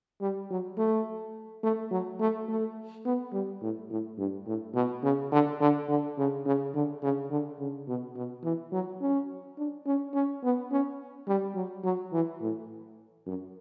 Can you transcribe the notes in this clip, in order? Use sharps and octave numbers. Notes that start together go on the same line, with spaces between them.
G3
F#3
A3
A3
F#3
A3
A3
B3
G3
A2
A2
G2
A2
B2
C#3
D3
D3
D3
C#3
C#3
D3
C#3
D3
C#3
B2
B2
E3
F#3
C#4
D4
C#4
C#4
B3
C#4
G3
F#3
F#3
E3
A2
F#2